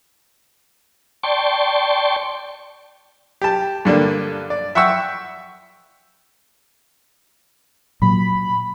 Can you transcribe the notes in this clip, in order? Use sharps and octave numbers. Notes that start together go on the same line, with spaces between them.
D5 G5 A5 C6 C#6
G4 A5
G2 D3 A#3 D4
D5
E5 F#5 G5 C#6 E6
A#2 F#3 B5